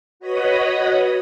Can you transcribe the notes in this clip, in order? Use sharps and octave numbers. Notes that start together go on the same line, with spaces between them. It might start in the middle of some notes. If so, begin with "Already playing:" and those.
F#4 B4 C#5 D#5 B5 D#6